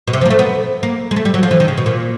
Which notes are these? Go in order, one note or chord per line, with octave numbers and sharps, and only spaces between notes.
B2
C3
F3
A#3
A3
B3
A#3
G#3
A3
G3
F#3
F3
E3
D#3
C#3
B2
A#2